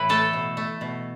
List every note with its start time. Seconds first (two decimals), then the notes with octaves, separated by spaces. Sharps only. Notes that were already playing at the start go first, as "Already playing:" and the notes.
Already playing: A2 E3 E4 B4
0.09 A3 A4
0.33 B2
0.57 A3
0.81 B2